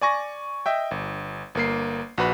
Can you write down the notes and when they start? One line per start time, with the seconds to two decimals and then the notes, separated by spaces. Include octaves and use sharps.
0.01 D5 G#5 C#6 A#6
0.66 D#5 E5 G5
0.91 G1
1.55 G1 A#3 C7
2.18 A#1 F#4 B4 B5